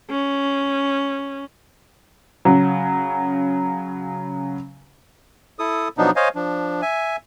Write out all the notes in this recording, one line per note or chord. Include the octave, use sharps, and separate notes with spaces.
C#4
C#3 F#3
E4 A4 D#6
B2 F3 F#3 B3 D4 D#4
C5 C#5 D#5 F5 G#5
F3 D4
E5 G#5